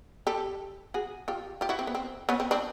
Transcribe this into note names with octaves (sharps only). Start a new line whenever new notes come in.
G4 A4
F#4 G#4
F4 G4
F4 G4
E4 F#4
C4
B3
C4
B3 C#4
C4
C4 D4